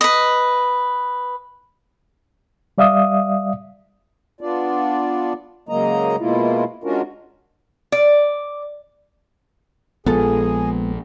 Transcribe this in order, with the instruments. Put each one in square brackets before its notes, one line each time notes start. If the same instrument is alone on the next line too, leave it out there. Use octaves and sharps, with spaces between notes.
[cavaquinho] B4 D#5
[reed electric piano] G3 D5 E5 F5 D#6
[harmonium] B3 D4 F4 D5
C#3 F#3 G#3 A#3 D#5 A#5
B2 G#3 A#3 E4 F4
G#3 C#4 D4 F4 F#4 A#4
[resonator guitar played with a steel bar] D5
[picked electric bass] A#1 F3 [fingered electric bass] G#3 B3 [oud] F4 A4 [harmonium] G#4